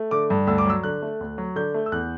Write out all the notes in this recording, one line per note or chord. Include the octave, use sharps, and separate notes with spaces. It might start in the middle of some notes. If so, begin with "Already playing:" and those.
Already playing: A3
D3 D6
G2
D2 E6
D6
F#3 E6
D3 F#6
A3
D2
F#3
D3 G6
A3
E6
E2 F#6